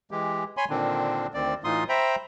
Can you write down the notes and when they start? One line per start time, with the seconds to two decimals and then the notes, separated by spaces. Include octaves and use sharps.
0.11 E3 G#3 G4
0.57 C#5 G#5 B5 C6
0.70 A#2 D3 D#3 C4 D4
1.34 D2 D#3 C4 D5
1.64 A2 E3 D#4 F4 C6 D#6
1.89 C5 E5 G5 A#5 B5